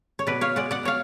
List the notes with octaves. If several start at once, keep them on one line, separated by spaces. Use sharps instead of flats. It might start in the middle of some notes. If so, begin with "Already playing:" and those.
C#5
B2 B4 D5
C#5 F5
G#3 D5 F#5
D5 F#5
B2 C#5 F5